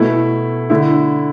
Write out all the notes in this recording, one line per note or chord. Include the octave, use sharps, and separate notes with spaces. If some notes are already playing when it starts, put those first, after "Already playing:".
Already playing: B2 A3 E4
D3 A3 E4